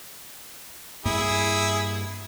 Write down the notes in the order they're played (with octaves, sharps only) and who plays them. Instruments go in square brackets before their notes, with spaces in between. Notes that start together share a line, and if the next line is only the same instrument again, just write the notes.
[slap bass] G2 A#3 [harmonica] E4 G#4